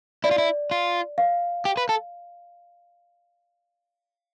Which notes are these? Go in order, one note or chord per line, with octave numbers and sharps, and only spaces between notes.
E4 D5
F4
E4
F4
F5
G4
B4
A4